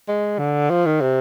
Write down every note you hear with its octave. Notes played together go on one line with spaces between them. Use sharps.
G#3
D3
F3
D#3
C3